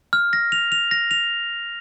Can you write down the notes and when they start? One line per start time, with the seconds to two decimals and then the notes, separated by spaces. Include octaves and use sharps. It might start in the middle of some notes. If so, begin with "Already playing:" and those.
0.13 F6
0.33 A#6
0.52 F7
0.72 F7
0.91 A#6
1.11 F7